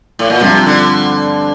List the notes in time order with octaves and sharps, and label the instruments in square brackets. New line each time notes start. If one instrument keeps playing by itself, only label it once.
[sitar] A2
A#2
[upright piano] G2 F3 C4 F4 [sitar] C3
[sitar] D3